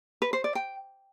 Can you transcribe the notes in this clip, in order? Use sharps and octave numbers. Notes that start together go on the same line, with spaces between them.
B4
C5
D5
G5